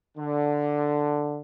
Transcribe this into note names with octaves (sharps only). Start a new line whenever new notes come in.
D3